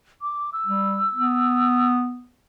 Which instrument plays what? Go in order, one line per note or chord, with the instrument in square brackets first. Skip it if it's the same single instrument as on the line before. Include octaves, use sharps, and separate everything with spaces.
[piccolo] D6
E6
[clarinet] G3
B3